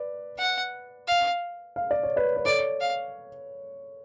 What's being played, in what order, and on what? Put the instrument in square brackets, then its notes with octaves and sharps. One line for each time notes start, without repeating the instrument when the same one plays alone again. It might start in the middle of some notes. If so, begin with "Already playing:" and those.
Already playing: [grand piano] B4 D5
[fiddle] F#5
F5
[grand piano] F5
D5
C#5
B4 D5
B4
[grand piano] A4 C#5 [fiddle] D5
[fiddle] F5